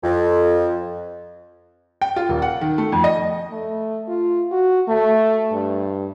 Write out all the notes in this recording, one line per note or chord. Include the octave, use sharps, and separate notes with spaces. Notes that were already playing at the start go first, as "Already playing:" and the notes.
F2
G5
F4
D#1
F#5
D#3
A3
F2
D#5
A3
F4
F#4
A3
G2